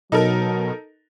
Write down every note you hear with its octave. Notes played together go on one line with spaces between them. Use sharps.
B2 F#3 D#4 A4 A#4